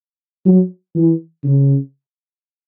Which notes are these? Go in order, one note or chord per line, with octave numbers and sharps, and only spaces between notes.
F#3
E3
C#3